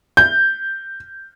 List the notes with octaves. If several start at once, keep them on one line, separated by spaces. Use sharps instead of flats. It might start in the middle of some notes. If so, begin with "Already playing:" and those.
G6